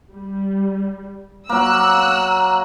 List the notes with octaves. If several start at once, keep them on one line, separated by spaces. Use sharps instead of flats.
G3
F#3 A#3 E6 F#6